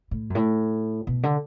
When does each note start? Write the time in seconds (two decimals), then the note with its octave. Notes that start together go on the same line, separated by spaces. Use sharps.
0.11 A2
0.30 F#2
0.35 A2
1.07 B2
1.23 D3